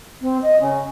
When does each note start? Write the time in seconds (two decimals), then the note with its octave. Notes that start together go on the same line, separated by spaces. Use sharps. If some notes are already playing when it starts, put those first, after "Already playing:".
0.21 C4
0.42 D#5
0.60 C#3